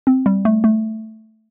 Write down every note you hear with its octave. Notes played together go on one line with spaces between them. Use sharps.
C4
G3
A3
A3